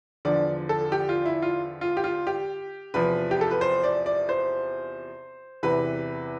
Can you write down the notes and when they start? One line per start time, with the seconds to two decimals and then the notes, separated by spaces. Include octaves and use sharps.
0.25 E2 D3 F3 D5
0.69 A4
0.92 G4
1.09 F4
1.25 E4
1.42 F4
1.81 F4
1.97 G4
2.04 F4
2.27 G4
2.94 E2 C3 F3 B4
3.31 G4
3.41 A4
3.51 B4
3.61 C5
3.83 D5
4.06 D5
4.29 C5
5.63 E2 C3 E3 B4